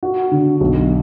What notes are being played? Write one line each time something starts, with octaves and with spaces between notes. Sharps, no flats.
F#4
D3
B1